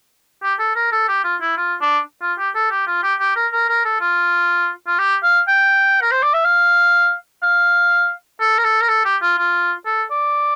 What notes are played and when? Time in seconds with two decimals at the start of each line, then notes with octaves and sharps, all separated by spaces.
0.43 G4
0.59 A4
0.76 A#4
0.92 A4
1.08 G4
1.24 F4
1.41 E4
1.57 F4
1.81 D4
2.22 F4
2.38 G4
2.55 A4
2.71 G4
2.87 F4
3.03 G4
3.20 G4
3.36 A#4
3.53 A#4
3.69 A#4
3.85 A4
4.01 F4
4.87 F4
4.99 G4
5.23 F5
5.48 G5
6.01 A#4
6.12 C5
6.23 D5
6.34 E5
6.45 F5
7.43 F5
8.41 A4
8.58 A#4
8.64 A4
8.81 A#4
8.89 A4
9.05 G4
9.22 F4
9.38 F4
9.86 A4
10.11 D5